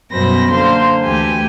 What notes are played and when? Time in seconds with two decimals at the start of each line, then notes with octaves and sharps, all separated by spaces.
0.11 F#2 B2 G3 C5 B5 A#6
0.51 D3 A#3 C5 F5 C6
1.02 D2 E3 A3 G4 G#5